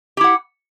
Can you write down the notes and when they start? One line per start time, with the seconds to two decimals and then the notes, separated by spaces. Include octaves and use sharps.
0.17 G4
0.21 E4
0.24 F#5